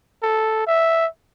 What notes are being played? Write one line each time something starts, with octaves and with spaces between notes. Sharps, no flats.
A4
E5